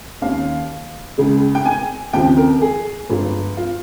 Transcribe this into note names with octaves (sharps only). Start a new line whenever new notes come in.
D#2 D#3 A#3 C#4 F5
C#2 C#3 G#3
G5
G#5
D#2 C#3 F3 C4 G5
A#4
G#4
G1 G2 F3 G#3
F4